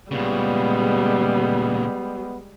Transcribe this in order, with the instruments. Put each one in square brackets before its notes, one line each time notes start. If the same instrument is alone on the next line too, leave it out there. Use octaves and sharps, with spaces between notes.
[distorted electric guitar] A#2 C#3 [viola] G3 G#3 [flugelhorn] B3